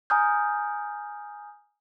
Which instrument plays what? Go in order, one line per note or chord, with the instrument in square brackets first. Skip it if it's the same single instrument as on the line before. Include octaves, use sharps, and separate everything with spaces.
[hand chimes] G#5 A#5 D#6 F6 G6